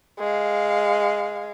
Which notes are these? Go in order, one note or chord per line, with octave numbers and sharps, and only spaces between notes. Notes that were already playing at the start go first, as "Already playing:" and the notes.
G#3 F5